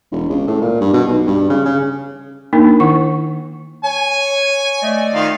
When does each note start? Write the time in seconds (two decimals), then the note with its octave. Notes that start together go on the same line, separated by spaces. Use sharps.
0.12 E1
0.29 C#2
0.47 A2
0.61 A#2
0.81 G2
0.94 B2
1.08 B1
1.27 G2
1.50 C#3
1.65 C#3
2.53 A#3 D4 D#4 A#4
2.80 D#3 E4 F#5 C#6
3.84 C#5 G#5
4.82 A3 D5 D#5
5.14 D#3 F4 F5